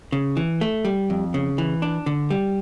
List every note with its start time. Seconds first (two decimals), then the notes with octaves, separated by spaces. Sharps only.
0.12 C#3
0.37 E3
0.61 A3
0.85 G3
1.10 F2
1.34 C#3
1.58 E3
1.82 D4
2.06 D3
2.30 G3